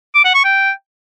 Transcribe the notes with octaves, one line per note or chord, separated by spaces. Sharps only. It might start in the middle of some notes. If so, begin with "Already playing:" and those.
D6
F#5
C#6
G5